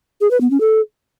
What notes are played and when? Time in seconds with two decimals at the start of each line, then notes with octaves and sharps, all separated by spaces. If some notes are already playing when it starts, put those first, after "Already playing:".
0.21 G#4
0.31 B4
0.41 B3
0.51 C#4
0.61 A4